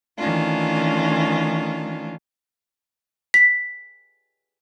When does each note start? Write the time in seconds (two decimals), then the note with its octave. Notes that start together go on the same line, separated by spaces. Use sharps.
0.18 D#3 E3 A3 C#4 D4 F4
3.34 B6